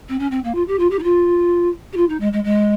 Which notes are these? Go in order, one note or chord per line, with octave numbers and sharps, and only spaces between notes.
C4
C#4
C4
A#3
F4
G4
F4
G4
D#4
F4
G4
F4
D#4
G#3
G#3
G#3